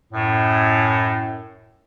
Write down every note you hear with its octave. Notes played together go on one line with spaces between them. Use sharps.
F#2 A2